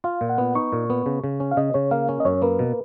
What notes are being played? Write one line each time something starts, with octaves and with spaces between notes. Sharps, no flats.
F4 F5
A#2
F#5
B3
D#4 C#6
A#2
B3
C#3
C#3
C#4
F5
C#3 D#5
C#3 C#5
A#3 F5
C#4
D#5
F#2 C#5
A#3 B4
B2